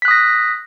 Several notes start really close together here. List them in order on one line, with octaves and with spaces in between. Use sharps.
B6 F#6 D#6 A#6